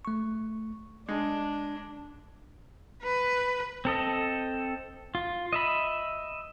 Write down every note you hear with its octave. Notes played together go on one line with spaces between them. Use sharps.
A3 C#6
G#3 D4
B4
C4 A4 D#5
F4
D#5 E5 B5